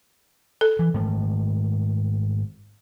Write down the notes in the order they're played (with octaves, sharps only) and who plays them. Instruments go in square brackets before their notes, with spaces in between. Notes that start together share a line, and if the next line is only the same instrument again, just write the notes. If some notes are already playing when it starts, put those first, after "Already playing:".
[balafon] A4
[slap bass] E3
G#2 D#3 A3